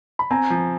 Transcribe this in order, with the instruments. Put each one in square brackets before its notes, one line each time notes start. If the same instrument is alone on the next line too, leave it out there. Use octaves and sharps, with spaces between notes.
[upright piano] B5
[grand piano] C4 [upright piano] G#5 A#5
[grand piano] F3